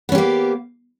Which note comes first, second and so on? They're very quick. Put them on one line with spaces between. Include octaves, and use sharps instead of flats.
B3 C#4 G4 A#3